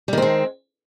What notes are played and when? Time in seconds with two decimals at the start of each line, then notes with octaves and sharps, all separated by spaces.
0.08 G3
0.13 D#3
0.18 C4
0.22 G#3